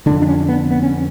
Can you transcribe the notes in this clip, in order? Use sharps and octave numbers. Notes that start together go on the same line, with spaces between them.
F2 D3 D4
D4
C#4
B3
B3
C#4